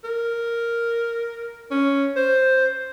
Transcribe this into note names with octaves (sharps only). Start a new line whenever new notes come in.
A#4
C#4
C5